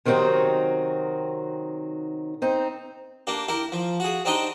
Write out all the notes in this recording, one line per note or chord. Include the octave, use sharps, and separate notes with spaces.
C3 D#3 F#3 C4 D#4 F#4
C4 D#4
A#3 D4 G4
E4 G4 A#4
F3
F#4 G#4
C4 D4 D#4 G4 D#5 G5